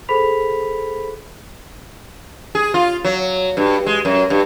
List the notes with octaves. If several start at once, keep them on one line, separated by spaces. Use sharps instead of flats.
G#4 A4 C5 B5 B6 F7
G#4
F4
F#3
G2
G#3
F#2
G2